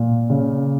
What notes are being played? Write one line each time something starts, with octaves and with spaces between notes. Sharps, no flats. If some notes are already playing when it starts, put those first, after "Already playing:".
Already playing: A#2
C#3